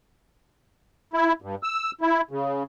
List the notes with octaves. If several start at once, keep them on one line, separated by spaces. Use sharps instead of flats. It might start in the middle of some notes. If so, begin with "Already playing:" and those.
E4
G2
E6
E4
C#3